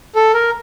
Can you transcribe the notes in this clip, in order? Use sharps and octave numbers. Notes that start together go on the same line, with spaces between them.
A4
A#4